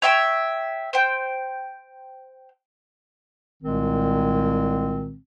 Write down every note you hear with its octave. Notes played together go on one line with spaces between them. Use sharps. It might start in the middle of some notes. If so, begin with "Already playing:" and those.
C#5 E5 G5 E6
C5 G5
C2 A#2 D#3 G#3 C4